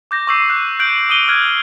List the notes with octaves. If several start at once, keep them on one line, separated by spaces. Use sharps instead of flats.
D6 G6 A#6
C#6 D6 E6 G6 C7
F#6
F#6 G6 D7 F#7
D#6 D#7 G7
F6 F#6 G#6